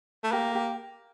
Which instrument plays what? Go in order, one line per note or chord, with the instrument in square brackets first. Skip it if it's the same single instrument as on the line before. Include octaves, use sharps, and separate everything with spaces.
[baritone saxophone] A3
[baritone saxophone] A#3 [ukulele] G4
[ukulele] G4